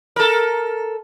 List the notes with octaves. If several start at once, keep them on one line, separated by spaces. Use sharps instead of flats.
A4 A#4